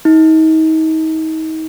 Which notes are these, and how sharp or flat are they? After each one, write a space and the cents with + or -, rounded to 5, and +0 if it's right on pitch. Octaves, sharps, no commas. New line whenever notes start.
D#4 +35